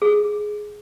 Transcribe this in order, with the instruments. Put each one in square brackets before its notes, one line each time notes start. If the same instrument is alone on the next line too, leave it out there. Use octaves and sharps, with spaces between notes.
[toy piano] G#4